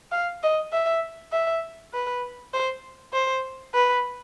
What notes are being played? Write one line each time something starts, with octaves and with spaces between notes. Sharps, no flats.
F5
D#5
E5
E5
B4
C5
C5
B4